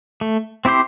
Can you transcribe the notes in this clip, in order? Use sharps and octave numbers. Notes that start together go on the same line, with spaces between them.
A3
C4 E4 G4 C5